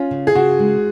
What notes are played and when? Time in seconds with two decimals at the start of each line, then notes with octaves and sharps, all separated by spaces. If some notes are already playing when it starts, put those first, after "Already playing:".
Already playing: C#4 F4
0.11 C#3
0.27 G#4
0.35 C#3 F#4
0.59 G#3